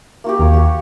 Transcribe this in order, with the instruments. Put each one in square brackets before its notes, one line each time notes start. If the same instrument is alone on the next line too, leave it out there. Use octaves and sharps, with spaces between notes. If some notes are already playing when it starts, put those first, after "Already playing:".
[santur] A#3 F#4 G4
[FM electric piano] D#2 [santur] A#4 C#5
[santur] F#4 G4